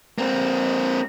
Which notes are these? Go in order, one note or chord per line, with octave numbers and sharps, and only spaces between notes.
A#3 C4